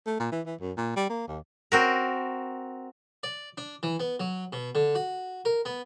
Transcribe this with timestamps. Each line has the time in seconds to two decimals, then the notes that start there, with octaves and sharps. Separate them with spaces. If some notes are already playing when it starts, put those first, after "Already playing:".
0.07 A3
0.20 A#2
0.32 E3
0.46 E3
0.61 F#2
0.77 A#2
0.96 G3
1.10 A#3
1.28 D#2
1.72 C4 F#4 A#4
3.23 D5
3.58 D4
3.83 E3
4.00 B3
4.20 F#3
4.53 B2
4.75 D3
4.95 F#4
5.45 A#4
5.65 B3